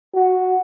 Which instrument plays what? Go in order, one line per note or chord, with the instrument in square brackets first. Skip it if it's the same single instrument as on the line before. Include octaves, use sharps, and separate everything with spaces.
[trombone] F#4